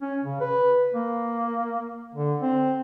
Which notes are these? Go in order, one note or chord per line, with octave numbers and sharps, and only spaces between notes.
C#4
C#3
B4
A#3
D3
C4